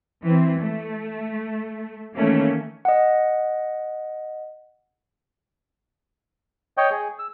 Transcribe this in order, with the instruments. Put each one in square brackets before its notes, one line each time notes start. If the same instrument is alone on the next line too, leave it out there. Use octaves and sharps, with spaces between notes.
[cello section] E3 C4
A3
D#3 E3 A3 A#3 C#4
[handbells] D#5 F#5
[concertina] C#5 D#5 G5
G#4
E6